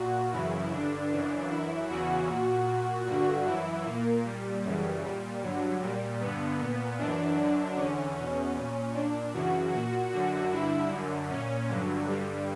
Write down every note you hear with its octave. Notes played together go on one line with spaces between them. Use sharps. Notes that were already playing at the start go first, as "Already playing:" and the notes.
Already playing: A#2 F#4
F#2 C#3 E3 E4
G2 D3 D4
F#2 C#3 E3
F#2 E3 E4
E2 C#3 E3 F#4
A#2
A#2
G2 D3 F#4
F#2 E3 E4
A#2 A#3
A#2 G3
F#2 C#3 E3 G3
A#2 G3
G2 D3 F#3
A#2 G3
G2 D3 B3
A#2
F#2 E3 D4
F#2 D3
E2 D3 C#4
E2 B2 C#4
A#2
A#2 D4
F#2 C#3 E3 F#4
A#2 F#4
F#2 D3 F#4
G2 D3 E4
F#2 D3
A#2 C#4
G2 D3 F#3
G2 D3 G3